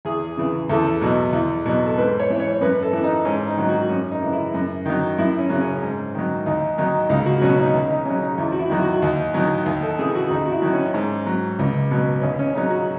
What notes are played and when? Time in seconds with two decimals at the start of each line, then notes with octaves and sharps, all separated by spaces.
0.05 E2 G#4
0.37 C#3 E3
0.69 E2 A4
1.01 B2 F#3
1.33 E2
1.66 B2 F#3
1.86 A4
1.98 G#2 B4
2.20 C#5
2.30 E3
2.40 C#5
2.61 F#2 B4
2.83 A4
2.93 E3
3.04 D#4
3.25 G#2 C#4
3.47 D#4
3.57 D#3 F#3
3.68 F#4
3.89 F#2 C#4
4.11 D#4
4.22 C#3 E3
4.32 E4
4.54 F#2
4.85 D#3 F#3
5.18 F#2 E4
5.39 C#4
5.50 C#3 F#3
5.61 C#4
5.83 G#2
6.14 D#3 F#3
6.46 D#2 D#4
6.78 D#3 F#3 D#4
7.09 C#2 D#4
7.26 F#4
7.42 B2 F#3 C#4
7.59 D#4
7.74 D#2
7.90 D#4
8.06 C#3 F#3 C#4
8.22 D#4
8.38 E2
8.52 F#4
8.59 E4
8.70 D#3 F#3
8.80 F#4
9.02 D#2
9.34 D#3 F#3
9.66 D#2
9.82 A4
9.99 C#3 E3 G#4
10.15 F#4
10.30 D#2 D#4
10.46 F#4
10.51 E4
10.62 D#3 F#3
10.73 C#4
10.94 G#2
11.26 F#3
11.59 C#2
11.91 B2 F#3
12.22 D#2 C#4
12.39 C#4
12.54 C#3 D#4
12.58 F#3
12.70 F#4